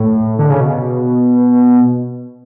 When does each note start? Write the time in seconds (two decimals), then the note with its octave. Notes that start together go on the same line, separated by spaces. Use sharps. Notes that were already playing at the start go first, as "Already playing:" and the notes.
Already playing: A2
0.39 D3
0.50 C#3
0.60 B2